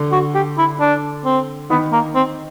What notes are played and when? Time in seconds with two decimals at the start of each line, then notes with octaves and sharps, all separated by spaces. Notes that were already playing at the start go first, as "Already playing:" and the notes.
Already playing: D3
0.12 F#4
0.34 G4
0.58 E4
0.80 D4
1.25 C4
1.70 D#3 B3
1.92 A#3
2.15 C4